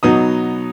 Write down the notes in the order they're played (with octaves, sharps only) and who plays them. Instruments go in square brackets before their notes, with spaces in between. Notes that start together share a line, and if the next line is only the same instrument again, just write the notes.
[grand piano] B2 F#3 B3 D#4 D#6